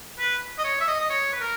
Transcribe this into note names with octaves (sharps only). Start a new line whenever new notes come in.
B4
D#5
C#5
E5
D#5
D#5
C#5
B4
A#4